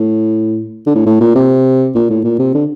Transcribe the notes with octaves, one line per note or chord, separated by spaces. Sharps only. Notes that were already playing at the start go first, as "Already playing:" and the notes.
Already playing: A2
D3
A2
A2
A#2
C3
A#2
A2
A#2
C3
D3